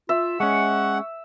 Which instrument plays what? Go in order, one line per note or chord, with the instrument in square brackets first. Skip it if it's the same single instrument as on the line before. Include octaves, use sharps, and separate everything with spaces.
[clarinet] F4 [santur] E5
[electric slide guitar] G#3 C#4 [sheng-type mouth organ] F#5 [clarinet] C#6